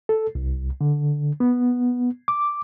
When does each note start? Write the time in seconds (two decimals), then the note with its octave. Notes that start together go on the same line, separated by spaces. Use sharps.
0.09 A4
0.35 C2
0.81 D3
1.40 B3
2.28 D6